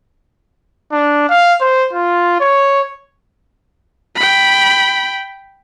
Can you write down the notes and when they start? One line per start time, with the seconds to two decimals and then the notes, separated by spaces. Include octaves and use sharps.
0.92 D4
1.29 F5
1.61 C5
1.93 F4
2.40 C#5
4.16 G5 B5